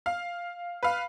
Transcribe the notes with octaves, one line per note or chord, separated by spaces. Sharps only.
F5
B4 F5